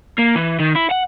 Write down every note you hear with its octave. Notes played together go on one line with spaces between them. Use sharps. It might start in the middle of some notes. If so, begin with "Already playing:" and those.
A#3
E3
D#3
E4
F#5